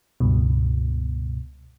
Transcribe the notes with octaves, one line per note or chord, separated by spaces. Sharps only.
C#2 G2 B2